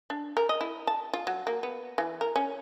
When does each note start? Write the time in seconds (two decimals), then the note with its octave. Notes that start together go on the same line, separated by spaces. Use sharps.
0.10 D4
0.37 A#4
0.49 D#5
0.61 E4
0.87 A5
1.13 F4
1.27 F#3
1.47 A#3
1.63 B3
1.98 E3
2.21 A#4
2.36 C#4